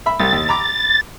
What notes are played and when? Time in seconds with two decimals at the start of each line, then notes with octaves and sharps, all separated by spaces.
0.06 E5 B5
0.20 C2 A6
0.32 D#2
0.49 A#5 B5 D6